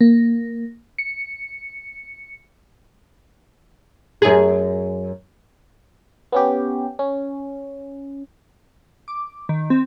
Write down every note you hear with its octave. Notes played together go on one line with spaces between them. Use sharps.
A#3
C#7
F#2 G#4
B3 C#4 G4
C#4
D6
D#3
C4